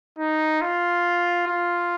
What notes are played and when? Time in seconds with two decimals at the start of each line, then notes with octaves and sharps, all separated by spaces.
0.19 D#4
0.61 F4
1.48 F4